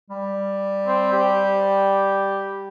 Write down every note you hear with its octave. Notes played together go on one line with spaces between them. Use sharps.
G3
C4
G4